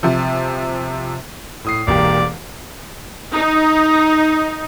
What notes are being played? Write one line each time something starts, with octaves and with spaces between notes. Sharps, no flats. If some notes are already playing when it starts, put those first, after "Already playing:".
C3 F3
A2 D#6 C7
E1 A#3 G4 D5
D#4